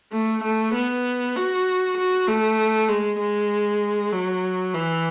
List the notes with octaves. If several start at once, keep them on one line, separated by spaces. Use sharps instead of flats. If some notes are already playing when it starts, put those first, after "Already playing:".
A3
A3
B3
F#4
F#4
A3
G#3
G#3
F#3
E3